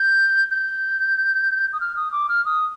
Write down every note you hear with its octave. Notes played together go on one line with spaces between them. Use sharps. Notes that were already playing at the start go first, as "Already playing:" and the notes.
Already playing: G6
G6
D#6
F6
D#6
D6
F6
D#6